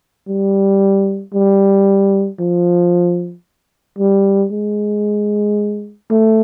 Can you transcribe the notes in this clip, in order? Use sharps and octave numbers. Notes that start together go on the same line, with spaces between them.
G3
G3
F3
G3
G#3
A3